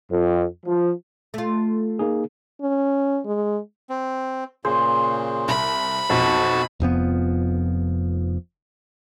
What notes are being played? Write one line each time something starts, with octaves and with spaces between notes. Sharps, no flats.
F2
F3
A3 F4
A#3 D#4 G#4
C#4
G#3
C4
A#2 C#3 G#4 C5
C2 B5
B1 F2 F#4 A5
F1 F2 F3 B3